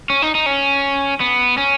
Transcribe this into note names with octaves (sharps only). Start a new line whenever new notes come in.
C#4
D#4
D#4
C#4
B3
C#4